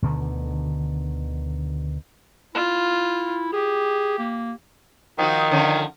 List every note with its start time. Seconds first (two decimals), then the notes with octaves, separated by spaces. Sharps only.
0.02 D2 B2 D3 D#3
2.55 E4 F4
3.53 G4 G#4
4.19 A#3
5.18 D#3 F3 D#4 F#4
5.51 D3 F3 C#4